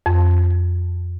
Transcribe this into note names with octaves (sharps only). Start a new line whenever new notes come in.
F2